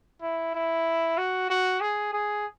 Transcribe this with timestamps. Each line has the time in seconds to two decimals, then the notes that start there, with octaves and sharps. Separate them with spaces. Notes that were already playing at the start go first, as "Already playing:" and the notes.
0.22 E4
0.55 E4
1.18 F#4
1.50 F#4
1.81 G#4
2.13 G#4